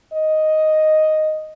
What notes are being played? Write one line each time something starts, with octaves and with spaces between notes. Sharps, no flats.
D#5